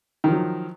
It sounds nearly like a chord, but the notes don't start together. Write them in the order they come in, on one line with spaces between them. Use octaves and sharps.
D#3 F3 F#3